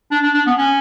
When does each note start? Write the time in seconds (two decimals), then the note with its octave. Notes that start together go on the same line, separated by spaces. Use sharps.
0.11 D4
0.23 D4
0.34 D4
0.47 B3
0.58 C#4